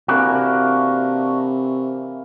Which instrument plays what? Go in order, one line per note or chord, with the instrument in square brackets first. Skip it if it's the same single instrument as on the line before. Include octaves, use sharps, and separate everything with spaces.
[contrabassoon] C3 [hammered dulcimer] E3 A#3 [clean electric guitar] D4 F#4